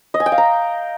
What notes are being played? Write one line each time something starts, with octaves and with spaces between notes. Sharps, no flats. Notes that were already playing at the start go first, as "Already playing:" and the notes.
D#5
G#5
G5
F5
A#5